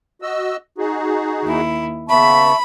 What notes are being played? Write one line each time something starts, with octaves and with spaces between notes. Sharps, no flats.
F#4 D#5 E6
D#4 F#4 G#4
D#2 E4
C#3 B3 E5 A5 B5 C#6